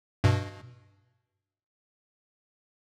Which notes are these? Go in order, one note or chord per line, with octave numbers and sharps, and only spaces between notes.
G2 B2